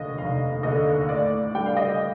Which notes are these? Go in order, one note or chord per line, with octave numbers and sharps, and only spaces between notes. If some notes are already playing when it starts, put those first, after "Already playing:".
Already playing: F1 D#2 D3 D#5 F5
F1 F5
D#2 D3 D#5
A2 D5
G3 D4 G5
F5
D#5
F5